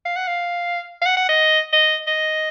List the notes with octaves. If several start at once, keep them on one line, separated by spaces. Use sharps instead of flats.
F5
F#5
F5
F5
F#5
F#5
D#5
D#5
D#5